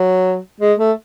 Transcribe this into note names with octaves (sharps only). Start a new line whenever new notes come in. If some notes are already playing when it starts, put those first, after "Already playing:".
Already playing: F#3
G#3
A3